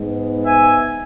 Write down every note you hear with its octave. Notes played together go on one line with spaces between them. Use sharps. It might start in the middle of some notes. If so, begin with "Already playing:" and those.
Already playing: G#2 G#3 B3
E5 G#5